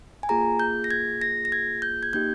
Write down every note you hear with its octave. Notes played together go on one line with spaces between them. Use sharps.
G#5
A#3 F4 G#4 A#5
G6
A#6
G#6
A#6
A#6
G#6
G6
G#6
A#3 D#4 G4 G6